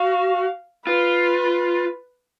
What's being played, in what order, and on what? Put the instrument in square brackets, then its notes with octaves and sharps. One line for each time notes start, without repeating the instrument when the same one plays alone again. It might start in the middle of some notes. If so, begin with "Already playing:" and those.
Already playing: [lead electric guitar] F#4 [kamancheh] F5
[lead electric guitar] F4 [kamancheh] B4